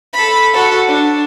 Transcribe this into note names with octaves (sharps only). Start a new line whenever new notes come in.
A4 B5
F#4 A4
D4